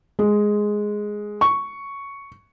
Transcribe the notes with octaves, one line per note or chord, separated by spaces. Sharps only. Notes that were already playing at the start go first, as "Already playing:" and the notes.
G#3
C#6